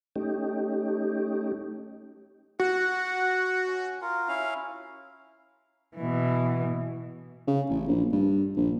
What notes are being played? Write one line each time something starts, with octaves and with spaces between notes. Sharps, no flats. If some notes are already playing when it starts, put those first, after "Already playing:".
A3 C#4 D#4 G4
F#4 F#5
C#4
F4 A#4
C#4 E4 F5
B2 E3
C#3
A1
A#1
G2
A#1